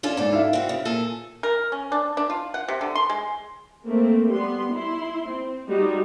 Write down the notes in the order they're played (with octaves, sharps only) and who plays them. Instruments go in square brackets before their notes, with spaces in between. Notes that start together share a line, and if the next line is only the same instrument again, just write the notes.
[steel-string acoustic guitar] C#4 F4 A4 [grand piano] D4
[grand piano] G#2 [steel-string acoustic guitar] D4 A4
[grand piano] E4 F5
[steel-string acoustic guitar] C4 F#4
C#3
A#2 G#4 A4
[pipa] A#4
C#4
D4
D4
F4
F#5
C3
D3
C6
G#3
[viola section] A3 A#3 C4
G3 B3 C6
E4 C6
C4
G3 G#3 D#4 F#4